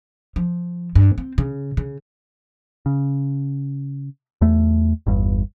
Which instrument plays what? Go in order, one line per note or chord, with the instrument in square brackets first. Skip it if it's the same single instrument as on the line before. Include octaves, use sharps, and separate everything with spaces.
[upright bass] F3
G2
C4
C#3
C#3
[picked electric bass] C#3
E2 A3
G1 E2 G2